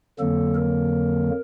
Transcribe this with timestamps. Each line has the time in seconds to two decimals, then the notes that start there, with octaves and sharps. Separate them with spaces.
0.20 F2 D3 F#3 A#3 A4
0.54 A#4